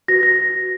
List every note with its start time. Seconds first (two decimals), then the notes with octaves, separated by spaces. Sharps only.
0.08 F#4 B4 A#6
0.23 A#6